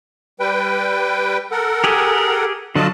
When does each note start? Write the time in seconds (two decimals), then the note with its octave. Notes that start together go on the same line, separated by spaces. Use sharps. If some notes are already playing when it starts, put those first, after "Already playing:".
0.40 G3 B4 G5
1.51 A4 A#4 F#5
1.84 G4 G#4
2.75 D3 F#3 F4 D#5 A5